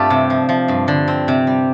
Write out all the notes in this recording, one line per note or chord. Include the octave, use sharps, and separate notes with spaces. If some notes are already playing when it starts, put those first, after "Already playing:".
Already playing: G2 G3 A3 C4 F4 G4 A4
C3
F3
F3
G2
D3
C4
C3
G3